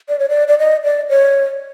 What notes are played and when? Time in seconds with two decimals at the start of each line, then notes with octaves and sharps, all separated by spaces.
0.09 D5
0.19 C#5
0.29 D5
0.48 D5
0.59 D#5
0.84 D5
1.09 C#5